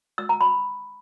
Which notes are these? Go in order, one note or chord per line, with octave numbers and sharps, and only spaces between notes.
E6
A#5
B5